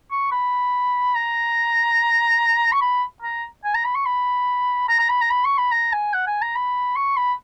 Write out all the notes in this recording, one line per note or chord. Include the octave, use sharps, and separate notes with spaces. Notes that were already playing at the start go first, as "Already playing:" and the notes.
C#6
B5
A#5
C#6
B5
A#5
G#5
A#5
B5
C#6
B5
A#5
A#5
B5
A#5
B5
C#6
B5
A#5
G#5
F#5
G#5
A#5
B5
C#6
B5